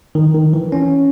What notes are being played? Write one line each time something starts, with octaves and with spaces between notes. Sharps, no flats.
D#3
D#3
E3
C#4